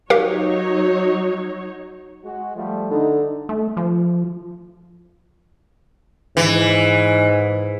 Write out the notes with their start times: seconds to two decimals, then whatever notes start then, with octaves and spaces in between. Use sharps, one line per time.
0.10 F#3 D#4 G4 A#4 C#5 F5
2.24 G#3 F#4
2.56 F3 G3 A3
2.91 D3 D#4
3.49 A3
3.77 F3
6.37 G#2 E3